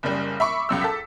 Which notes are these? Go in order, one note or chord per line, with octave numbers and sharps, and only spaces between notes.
F#1 C#3 G3
E5 B5 C#6 D6
C#2 F#2 E6
A4 B6